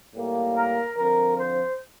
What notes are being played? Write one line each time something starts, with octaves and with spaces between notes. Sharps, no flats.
A2 G3 A#3
A#4
D3 F3 C4 A#4
C5